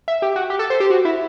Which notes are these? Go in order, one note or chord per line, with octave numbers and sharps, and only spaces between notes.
E5
G4
F#4
G4
A4
C5
G4
F#4
E4